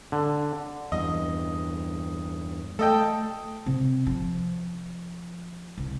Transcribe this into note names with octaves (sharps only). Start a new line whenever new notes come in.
D3
E2 G2 D#5
A3 A4 D#5 G5
C3
F3
C2